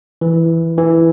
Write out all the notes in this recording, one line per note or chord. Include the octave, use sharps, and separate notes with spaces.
E3
E3